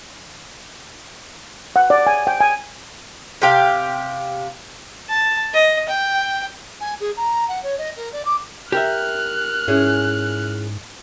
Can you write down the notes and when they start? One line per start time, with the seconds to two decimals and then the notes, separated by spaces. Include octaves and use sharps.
1.76 F#5
1.90 D5
2.07 G#5
2.27 G5
2.40 G#5
3.42 C3 G4 F5
5.09 A5
5.54 D#5
5.89 G5
6.80 G#5
7.00 G#4
7.16 A#5
7.48 F#5
7.62 C#5
7.78 D#5
7.96 A#4
8.12 D5
8.24 D6
8.72 G4 A#4 E5 F6 F#6
9.68 G#2 C#4 E4 G#4